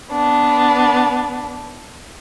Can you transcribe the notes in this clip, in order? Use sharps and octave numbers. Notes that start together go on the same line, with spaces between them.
B3 D4